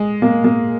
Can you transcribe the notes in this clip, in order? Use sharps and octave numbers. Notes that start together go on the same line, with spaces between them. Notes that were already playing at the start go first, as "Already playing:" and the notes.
Already playing: G#3
A#3
A#3